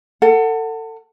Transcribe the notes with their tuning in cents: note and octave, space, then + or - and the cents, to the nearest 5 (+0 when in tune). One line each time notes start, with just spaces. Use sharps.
A4 +30 F#5 +5